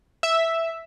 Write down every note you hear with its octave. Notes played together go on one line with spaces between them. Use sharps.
E5